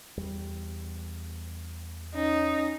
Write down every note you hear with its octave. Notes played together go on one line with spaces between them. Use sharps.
E2 G3
C#4 D#4